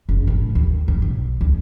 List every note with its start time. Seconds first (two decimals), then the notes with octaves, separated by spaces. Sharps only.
0.09 F#1
0.27 A2
0.55 D#2
0.88 A2
1.02 B1
1.41 D2